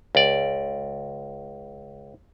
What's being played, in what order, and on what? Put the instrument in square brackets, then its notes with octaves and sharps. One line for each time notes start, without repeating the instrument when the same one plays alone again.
[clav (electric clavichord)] C#2 D5